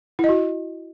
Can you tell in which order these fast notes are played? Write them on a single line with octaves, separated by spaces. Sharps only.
E4 D#5 F#4